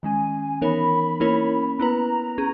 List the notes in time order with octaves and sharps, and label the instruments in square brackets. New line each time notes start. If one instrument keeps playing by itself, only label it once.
[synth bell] D#3 G#3 C#4 [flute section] G#5
[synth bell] E3 B3 D#4 A#4 C#5 [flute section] B5
[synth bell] A#3 C#4 E4 A#4 C#5
[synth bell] B3 E4 B4 [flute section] A#5
[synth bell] C#4 G#4